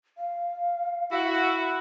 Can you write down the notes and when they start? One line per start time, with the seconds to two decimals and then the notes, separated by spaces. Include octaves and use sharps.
0.18 F5
1.12 E4 F#4